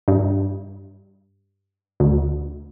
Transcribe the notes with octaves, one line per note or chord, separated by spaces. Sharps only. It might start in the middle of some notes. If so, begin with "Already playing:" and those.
G2
D2